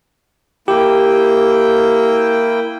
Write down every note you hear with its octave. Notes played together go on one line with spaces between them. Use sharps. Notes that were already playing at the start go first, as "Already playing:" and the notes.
A#3 E4 G4 G5